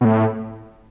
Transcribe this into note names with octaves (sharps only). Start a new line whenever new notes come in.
B2
A2